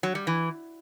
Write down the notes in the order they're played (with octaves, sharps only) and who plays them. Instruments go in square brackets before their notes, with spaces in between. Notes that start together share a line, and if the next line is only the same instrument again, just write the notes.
[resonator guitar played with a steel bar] F#3
G3
E3